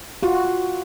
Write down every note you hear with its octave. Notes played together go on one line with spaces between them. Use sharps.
F4 F#4